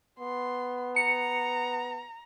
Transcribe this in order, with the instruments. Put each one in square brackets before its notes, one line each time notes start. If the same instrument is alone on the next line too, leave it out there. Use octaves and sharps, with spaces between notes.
[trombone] B3 [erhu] C6
[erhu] A#5 [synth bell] C#7